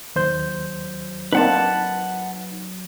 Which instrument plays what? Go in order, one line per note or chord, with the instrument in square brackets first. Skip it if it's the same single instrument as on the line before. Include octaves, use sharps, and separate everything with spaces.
[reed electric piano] D#2 C5 G6 [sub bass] F#3
[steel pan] A#3 C4 D4 [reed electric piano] D#4 [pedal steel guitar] B4 F#5 A5